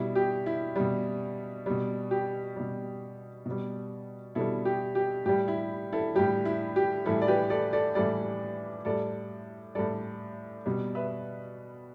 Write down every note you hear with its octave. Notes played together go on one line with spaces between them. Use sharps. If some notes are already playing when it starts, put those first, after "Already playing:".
Already playing: B2 G3 E4
G4
E4
B2 G3
B2 G3
G4
B2 G3
B2
G3
B2 G3 E4 A4
G4
G4
A2 G3 G4
E4
E4 A4
A2 G3 G4
E4
G4
A2 E3 G3 E4 A4
D5
G4 B4
A4 D5
A4 D5
A2 E3 G3 A4 D5
A2 G3 A4 D5
A2 G3 A4 D5
B2 G3
B4 E5